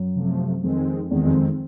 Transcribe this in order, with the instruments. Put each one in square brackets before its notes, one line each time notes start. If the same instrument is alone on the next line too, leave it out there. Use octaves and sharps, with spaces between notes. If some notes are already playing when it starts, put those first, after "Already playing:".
Already playing: [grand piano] F#2
[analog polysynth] C3 F3 A3
[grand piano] F2 [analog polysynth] D#3 G#3 C4
[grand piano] E2 [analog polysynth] D#3 G#3 C4
[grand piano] F2